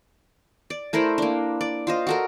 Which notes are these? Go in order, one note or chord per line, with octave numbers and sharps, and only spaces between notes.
D5
A3 E4 A#4 C5
A#3 D4
D5
F4 C5 D#5
F#4 A4 A#4